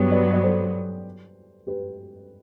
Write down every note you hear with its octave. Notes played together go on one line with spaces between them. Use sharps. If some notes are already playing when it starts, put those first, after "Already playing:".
Already playing: G2 F#3 B3 G4 B4
B4 D5
D5
A4 C5
G4 B4